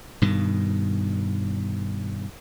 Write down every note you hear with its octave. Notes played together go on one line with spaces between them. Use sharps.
G2 B2 D#3